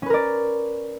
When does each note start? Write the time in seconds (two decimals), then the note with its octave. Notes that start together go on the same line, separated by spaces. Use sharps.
0.02 C#4
0.06 B4
0.10 A#4
0.14 D5